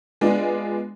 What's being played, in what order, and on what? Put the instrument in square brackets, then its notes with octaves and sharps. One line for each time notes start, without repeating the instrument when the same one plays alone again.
[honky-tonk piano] G#3 B3 D4 F4